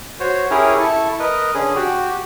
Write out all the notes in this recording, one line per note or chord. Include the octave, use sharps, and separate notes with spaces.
F#4 C5 C#5
C#4 E4 G4 G#4 A#4 C#5
E4 A4 C#6
A#4 B4 D#5
D3 C#4 G#4
F#4 G4